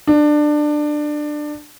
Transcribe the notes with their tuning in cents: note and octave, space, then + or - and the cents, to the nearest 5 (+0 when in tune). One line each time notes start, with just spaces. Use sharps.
D4 +20